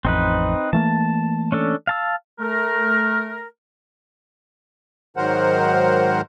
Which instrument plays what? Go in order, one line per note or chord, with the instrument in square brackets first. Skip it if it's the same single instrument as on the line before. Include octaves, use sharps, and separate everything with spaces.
[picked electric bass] A1 F2 [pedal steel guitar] C4 D#4 B4
[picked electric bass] E3 A3 A#3 [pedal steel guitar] A5
[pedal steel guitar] C#4 D4 A4
F5 A5 E6
[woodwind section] A3 A#4
[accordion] G#2 D#3 F#3 A#4 C5 F#5